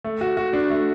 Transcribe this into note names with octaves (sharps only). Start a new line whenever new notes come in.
A3
F#4
F#4
D4
A3